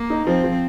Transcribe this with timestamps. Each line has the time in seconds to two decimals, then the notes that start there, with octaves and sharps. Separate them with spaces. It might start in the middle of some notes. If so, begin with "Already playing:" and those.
Already playing: A#3
0.10 D#4
0.27 F3 C4
0.44 F3